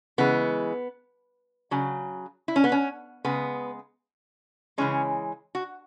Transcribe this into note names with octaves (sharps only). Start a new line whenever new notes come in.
C#3 E3 G#3 B3
C#3 F#3
E4
C#4
B3
C#4
C#3 G#3 B3
C#3 E3 G#3 C#4
F#4